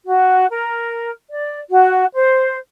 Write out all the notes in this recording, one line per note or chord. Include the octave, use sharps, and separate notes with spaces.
F#4
A#4
D5
F#4
C5